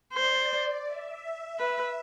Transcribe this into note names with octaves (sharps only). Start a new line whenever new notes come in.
C5 D5
D5
E5
B4